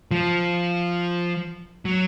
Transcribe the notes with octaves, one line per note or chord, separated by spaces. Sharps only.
F3
F#3